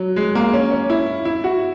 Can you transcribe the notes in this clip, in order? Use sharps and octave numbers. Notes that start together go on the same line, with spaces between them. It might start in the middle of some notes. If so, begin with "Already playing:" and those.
Already playing: F#3
G#3
A#3
C#4
C#4
E4
E4
F#4